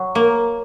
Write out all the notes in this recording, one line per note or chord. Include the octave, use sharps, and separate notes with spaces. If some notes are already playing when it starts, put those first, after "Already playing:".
Already playing: F#3
A#3